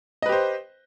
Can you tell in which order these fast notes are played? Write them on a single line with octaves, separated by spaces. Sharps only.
D#5 B4 G4 C5